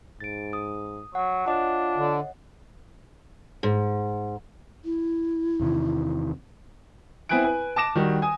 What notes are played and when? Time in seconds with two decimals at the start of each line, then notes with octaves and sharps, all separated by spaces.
0.20 G#2 A6 D7
0.53 D#6
1.15 F#3 F#5
1.47 D4 F4 C#5 D#5 F#5
1.96 D3
3.63 G#2
4.85 E4
5.60 E2 C3 D#3
7.29 B3 C4 E4 G#5 F#6 D7
7.44 B4 G#5
7.76 A5 D6 A#6 E7
7.95 D#3 G3 F#4
8.22 G#5 D#6